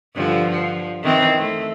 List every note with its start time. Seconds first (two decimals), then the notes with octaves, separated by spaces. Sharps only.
0.15 G2 D3 F3
0.51 F3
1.02 D#3 E3 C4
1.38 A3